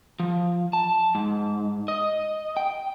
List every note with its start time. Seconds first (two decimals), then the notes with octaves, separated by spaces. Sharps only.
0.20 F3
0.73 A5
1.15 G#2
1.88 D#5
2.57 G5